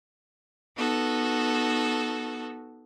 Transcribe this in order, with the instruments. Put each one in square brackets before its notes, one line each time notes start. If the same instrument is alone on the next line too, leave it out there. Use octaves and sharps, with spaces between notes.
[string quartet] B3 D#4 F#4 A4